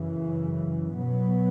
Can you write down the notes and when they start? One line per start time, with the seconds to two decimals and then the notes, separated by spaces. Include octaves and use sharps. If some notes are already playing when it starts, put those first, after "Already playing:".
Already playing: F#2 C#3 E3
0.95 B2 F#3 B3